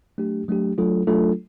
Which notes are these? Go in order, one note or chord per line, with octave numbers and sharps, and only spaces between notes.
F#3 A3 D4 G4
F#3 A3 D4 G4
F#3 A3 D4 F4 A4
F#3 A3 D4 F4 A4